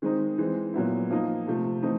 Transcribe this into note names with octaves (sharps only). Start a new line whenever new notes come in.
D#3 G#3 C4 D#4
E3 G#3 C4
A#2 F#3 B3 E4
F3 A#3 D#4
C3 F3 A3
E3 A3 C4 D#4